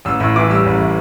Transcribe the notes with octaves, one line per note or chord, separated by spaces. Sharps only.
A1 E6
A2 E6
E3 D6
G3 E6
A1
A2